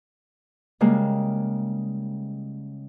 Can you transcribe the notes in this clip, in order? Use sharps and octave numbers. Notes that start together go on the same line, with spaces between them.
C#3 G3 G#3 A#3